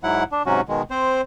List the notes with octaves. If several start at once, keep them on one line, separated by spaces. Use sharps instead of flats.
G#2 F#3 E4 F#5
D4
G#2 C3 F#3 C#4 F#4
B2 D#3 G#3
C4 C5